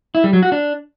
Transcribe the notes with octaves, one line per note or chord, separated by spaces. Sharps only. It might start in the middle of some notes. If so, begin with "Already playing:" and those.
E4
G3
F#3
F#4
D4